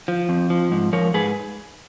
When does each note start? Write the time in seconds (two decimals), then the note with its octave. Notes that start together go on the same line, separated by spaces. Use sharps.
0.08 F3
0.29 F2
0.50 F3
0.72 G#2
0.93 F3 A#4 C#5
1.14 G#2 G#4 B4